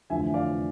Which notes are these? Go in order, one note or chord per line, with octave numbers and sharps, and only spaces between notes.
F1 E2 D3 F3 E5 G#5
D5 F5